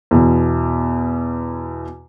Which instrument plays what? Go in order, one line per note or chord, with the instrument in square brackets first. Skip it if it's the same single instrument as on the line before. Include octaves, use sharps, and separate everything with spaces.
[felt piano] E2 B2